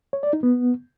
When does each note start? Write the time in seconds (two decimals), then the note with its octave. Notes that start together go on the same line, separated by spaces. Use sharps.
0.13 C#5
0.23 D5
0.33 D#4
0.43 B3